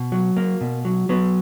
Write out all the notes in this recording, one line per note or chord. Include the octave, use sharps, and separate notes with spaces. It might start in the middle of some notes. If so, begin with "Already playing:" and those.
Already playing: B2
F#3
A#3
B2
F#3
F#3 B3